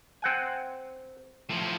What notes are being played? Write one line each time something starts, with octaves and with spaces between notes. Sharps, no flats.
C4 F#5 G#5
A2 F3